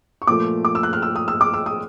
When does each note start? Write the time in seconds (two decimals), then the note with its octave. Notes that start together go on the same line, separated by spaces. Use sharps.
0.22 C#6
0.27 A#2 F3 A3 D6
0.65 D6
0.75 E6
0.83 F#6
0.93 F6
1.02 E6
1.16 D#6
1.28 E6
1.41 D6
1.53 E6
1.66 D#6